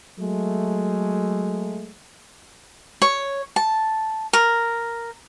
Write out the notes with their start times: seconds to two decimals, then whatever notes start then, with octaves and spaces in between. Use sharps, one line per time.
0.19 F#3 G#3 A3
3.02 C#5
3.56 A5
4.33 A#4